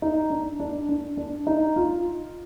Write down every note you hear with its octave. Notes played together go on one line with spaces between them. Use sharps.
D#4
D4
D4
D4
D4
D#4
F4